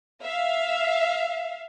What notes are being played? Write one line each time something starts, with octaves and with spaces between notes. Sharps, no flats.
E5 F5